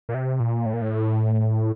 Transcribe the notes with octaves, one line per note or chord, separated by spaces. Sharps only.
A#2
C3
A#2
A2
A#2
A2